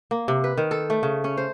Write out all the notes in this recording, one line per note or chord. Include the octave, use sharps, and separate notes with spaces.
A#3
C3
B4
D#3
A4
A3
C#3
C#4
C5